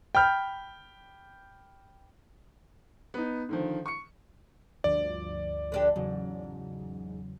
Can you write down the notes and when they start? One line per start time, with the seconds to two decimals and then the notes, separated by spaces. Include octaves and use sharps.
0.15 G5 B5 F6 G6
3.14 B3 D#4
3.49 D3 D#3 F3
3.86 C#6 C#7
4.84 D2 G2 F3 D5
5.72 D3 D4 G4
5.96 E2 G#2 C#3 F#3